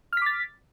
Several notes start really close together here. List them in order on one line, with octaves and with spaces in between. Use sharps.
F6 B6 D6 A6